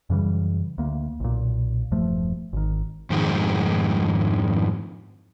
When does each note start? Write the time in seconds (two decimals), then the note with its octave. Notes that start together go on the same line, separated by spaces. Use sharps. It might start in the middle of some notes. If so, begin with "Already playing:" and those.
0.10 F#2 C#3 E3 G3
0.78 D2 A#3
1.20 B1 A#2
1.91 E1 G2 F3 A3
2.53 G#1 D#3
3.10 F2 G#2 D#3 G#3